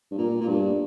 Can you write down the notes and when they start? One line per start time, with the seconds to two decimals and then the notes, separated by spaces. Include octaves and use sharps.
0.11 G2
0.18 A#2
0.41 A#2
0.48 G2